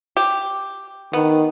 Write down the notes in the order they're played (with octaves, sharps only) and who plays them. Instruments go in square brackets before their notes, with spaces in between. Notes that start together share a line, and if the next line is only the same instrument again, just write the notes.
[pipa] G4
[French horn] D#3 [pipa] B3